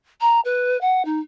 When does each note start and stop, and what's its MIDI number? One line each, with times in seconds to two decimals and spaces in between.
0.21 0.40 82
0.45 0.79 71
0.81 1.05 78
1.05 1.19 63